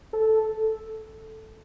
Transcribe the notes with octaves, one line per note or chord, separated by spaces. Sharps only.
A4